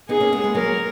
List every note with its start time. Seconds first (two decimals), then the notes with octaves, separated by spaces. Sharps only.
0.09 B3 D#4 G#4
0.20 A#3 C#4
0.32 G#3 B3
0.44 G#3 B3
0.55 F#3 A#3 A#4